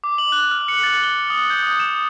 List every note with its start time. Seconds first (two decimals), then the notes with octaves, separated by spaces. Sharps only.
0.04 D6
0.18 F#7
0.32 F#6
0.51 F6
0.68 C#7
0.83 A6
1.03 G7
1.30 D#6
1.50 G6
1.63 D#6
1.80 E7